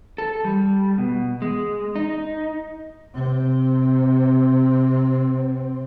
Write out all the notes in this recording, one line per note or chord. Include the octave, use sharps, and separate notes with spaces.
A4
G3
B2
G#3
D#4
C3 C4